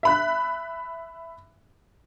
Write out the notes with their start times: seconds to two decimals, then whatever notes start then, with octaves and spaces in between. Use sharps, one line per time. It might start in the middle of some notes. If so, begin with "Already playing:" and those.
0.03 E5 B5 F#6